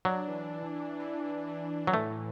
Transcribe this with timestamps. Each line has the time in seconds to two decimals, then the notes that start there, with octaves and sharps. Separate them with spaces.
0.05 F#3 D4
0.28 E3
0.52 E3
0.76 E3
1.00 E3
1.23 E3
1.47 E3
1.70 E3
1.87 F#3
1.93 A2 A3